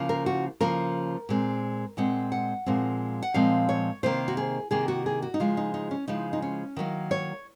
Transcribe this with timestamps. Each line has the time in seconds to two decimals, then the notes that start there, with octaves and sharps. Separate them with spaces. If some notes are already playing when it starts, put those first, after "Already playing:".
Already playing: C#3 F3 A#3
0.09 A#4
0.26 F#4
0.60 C#3 F3 A#3 A#4
1.29 A#2 G#3 C4
1.97 A#2 G#3 C4 F#5
2.32 F#5
2.66 A#2 F3 G#3 C4
3.23 F#5
3.34 A#2 F3 G#3 C4 F5
3.69 C#5
4.03 C3 D#3 A#3 C5
4.28 F#4
4.37 G#4
4.71 C3 D#3 A#3 G#4
4.88 F#4
5.06 G#4
5.22 F#4
5.34 D#4
5.40 C#3 F3 G#3 F4
5.57 D#4
5.74 D#4
5.91 C#4
6.08 C#3 F3 G#3 D#4
6.33 D#4
6.42 C#4
6.76 D#3 F#3 A#3
7.11 C#5